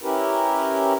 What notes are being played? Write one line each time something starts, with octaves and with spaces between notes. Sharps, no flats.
C#4 E4 G4 A#4 B4